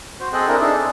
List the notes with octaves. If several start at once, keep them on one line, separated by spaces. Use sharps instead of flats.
F#4 C5
C4 G#4 A4 D#5 G5 F#6
C4 D4 E4 A#4
D4 D#4 G#4 A4
C4